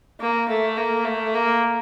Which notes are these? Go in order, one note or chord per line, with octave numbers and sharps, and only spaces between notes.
A#3
A3
A#3
A3
A#3